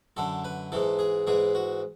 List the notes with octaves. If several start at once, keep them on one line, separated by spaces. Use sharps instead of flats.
F#2 D3 A4
B4
G#2 E3 A4
G#4
G#2 E3 G#4
F#4